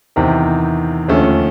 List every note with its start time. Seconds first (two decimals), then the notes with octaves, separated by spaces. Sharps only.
0.16 E2 C3 D#3
1.08 D#2 D3 F3 A3 C#4